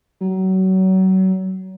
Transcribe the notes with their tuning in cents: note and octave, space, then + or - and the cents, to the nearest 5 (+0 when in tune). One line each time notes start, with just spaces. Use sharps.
F#3 +30